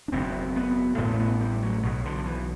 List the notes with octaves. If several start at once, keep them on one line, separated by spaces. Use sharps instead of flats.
D4
F#1 E2 B2 C4
B3
A1 A2 B3
A3
B3
G3
F#3
B1 B2 F#3
D3
D3
E3